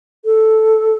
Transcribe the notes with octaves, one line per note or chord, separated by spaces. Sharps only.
A4